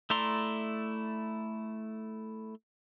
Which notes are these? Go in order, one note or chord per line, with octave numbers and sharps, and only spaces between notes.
A3 E4 D5 A#5 C6